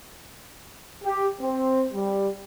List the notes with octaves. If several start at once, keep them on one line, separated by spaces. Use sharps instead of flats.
G4
C4
G3